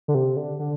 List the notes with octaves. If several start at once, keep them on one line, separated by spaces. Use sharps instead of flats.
D3
C3
D3
D3